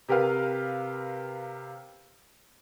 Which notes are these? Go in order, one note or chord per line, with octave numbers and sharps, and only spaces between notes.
C3 G4 A#4 B4 F5